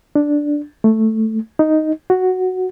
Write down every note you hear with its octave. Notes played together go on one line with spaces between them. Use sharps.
D4
A3
D#4
F#4